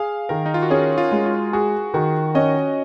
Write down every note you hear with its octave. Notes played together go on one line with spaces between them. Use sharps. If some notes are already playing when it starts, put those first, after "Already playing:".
Already playing: G#4 F5
D#3 A#4
D#4
F4
F#4
C#4 G#4
F4
G#3
F4
F#4 G#4
D#3 F#4
C#4 D#5